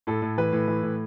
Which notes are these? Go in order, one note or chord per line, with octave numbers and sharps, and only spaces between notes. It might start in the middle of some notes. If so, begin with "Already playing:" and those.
A2 A4
A2
E3 B4
A2
E3
A2